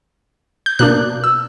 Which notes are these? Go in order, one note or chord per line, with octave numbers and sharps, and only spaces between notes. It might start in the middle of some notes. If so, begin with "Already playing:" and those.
G6
B2 A#3 D4 F#6
E6